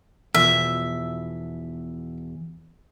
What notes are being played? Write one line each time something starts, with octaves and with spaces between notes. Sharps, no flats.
E2 B2 F3 E5